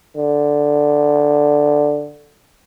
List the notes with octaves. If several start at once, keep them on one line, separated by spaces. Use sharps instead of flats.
D3